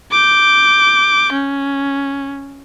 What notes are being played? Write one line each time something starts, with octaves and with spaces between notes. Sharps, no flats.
D6 G6
C#4